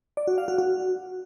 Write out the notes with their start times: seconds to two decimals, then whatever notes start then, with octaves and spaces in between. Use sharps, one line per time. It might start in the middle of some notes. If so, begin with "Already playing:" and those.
0.17 D5
0.27 F#4
0.38 F5
0.48 F#4
0.58 F#4